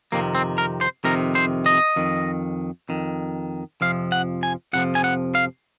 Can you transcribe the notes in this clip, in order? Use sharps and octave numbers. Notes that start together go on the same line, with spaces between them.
F2 C3 D#3 A#3
C4
A#4
C5
F2 C3 D#3 A#4
C5
D#5
F2 D#3
F2 D#3
F2 C3 F3 F5
F#5
G#5
F2 C3 F3 F#5
G#5
F#5
F5